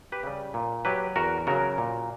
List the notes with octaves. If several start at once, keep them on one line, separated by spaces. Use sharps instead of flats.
G4 B4
C#3 G3
A#2
F#3 G4 B4
E2 F#4 A#4
C#3 F#3 F#4 A#4
A#2